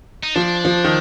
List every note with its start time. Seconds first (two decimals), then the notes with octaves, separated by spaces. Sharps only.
0.24 D#4
0.35 F3 D4
0.65 F3
0.84 D#3